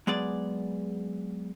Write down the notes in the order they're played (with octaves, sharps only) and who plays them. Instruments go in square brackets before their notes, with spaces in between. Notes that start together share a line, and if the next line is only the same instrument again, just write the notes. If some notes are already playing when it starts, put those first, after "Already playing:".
[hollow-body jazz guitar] F#3 G#3 B3 G#4 D5